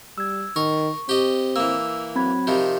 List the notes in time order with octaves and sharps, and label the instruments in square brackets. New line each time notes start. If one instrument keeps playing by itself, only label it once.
[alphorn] G3 [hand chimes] E6 G#6
[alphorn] D#3 [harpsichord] A#4 [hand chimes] C#6
[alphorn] C4 [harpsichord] G4 D#5
[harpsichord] E3 A#3 [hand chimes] E6
[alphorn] F#3 [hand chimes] C4 B5 G#6
[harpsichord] C3 D#3 F3